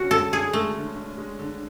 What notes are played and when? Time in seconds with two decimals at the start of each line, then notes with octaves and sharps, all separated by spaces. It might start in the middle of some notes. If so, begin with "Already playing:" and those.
Already playing: D3 C#4 F#4
0.11 D3 A4
0.32 D3 G#4
0.53 G#3 A3
0.75 D3
0.96 D3
1.17 G#3
1.39 D3